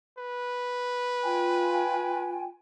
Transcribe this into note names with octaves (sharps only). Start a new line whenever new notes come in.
B4
F4 G5 G#5